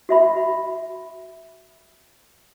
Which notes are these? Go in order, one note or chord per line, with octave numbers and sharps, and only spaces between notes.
F#4 E5 B5